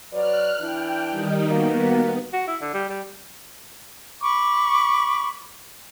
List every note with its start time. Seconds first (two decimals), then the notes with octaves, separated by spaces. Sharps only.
0.13 F#3 B4 D5 F6 F#6
0.61 E3 D4 E4 G5
1.09 D#3 G3 D#4
1.51 A#3 B3 F#4
2.33 F#4
2.47 E4
2.61 D3
2.74 G3
2.89 G3
4.21 B5 C#6 D6